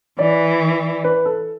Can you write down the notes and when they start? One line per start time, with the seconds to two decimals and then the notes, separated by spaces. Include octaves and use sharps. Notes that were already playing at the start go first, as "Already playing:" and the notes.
0.19 E3 D5
1.04 B4
1.25 A4